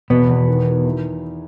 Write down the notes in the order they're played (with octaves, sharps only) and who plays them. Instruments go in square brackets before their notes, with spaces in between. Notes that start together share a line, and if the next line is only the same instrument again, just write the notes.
[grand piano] E2 [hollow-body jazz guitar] B2 B3
[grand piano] E2
D#3
D#3
E4